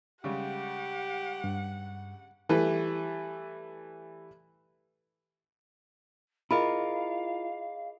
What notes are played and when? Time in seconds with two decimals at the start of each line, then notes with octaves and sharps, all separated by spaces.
0.24 C#3 G3 G#3 G4 F#5
1.44 G2
2.49 E3 G3 A3 B4
6.51 E4 F4 G#4 A#4 D#5 F5 B5 D7